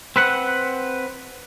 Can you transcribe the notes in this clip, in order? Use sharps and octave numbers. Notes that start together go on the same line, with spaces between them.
C4 B4 F#5